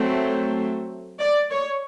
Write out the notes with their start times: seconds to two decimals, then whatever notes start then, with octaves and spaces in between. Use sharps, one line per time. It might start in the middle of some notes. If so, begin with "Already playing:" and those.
Already playing: F#3 A3 C4
1.20 D5
1.50 C#5